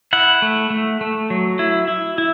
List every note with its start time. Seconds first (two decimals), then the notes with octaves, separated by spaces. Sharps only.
0.13 E4 F#5
0.42 A3
0.70 A3
1.01 A3
1.30 F#3
1.59 E4
1.88 E4
2.18 E4